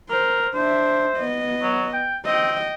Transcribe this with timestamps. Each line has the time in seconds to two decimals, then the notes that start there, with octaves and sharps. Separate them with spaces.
0.10 A#4 C5
0.54 D4 C5 E5
1.17 B3 D#5
1.63 F#3
1.94 G5
2.26 C4 D#5 G5